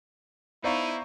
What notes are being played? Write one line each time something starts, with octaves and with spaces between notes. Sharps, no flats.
B3 D#4 E4 C5 D5 F5 A#5 C#6